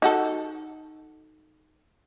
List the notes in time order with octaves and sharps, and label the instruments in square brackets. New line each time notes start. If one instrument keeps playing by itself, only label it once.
[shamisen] D#4 F#4 A4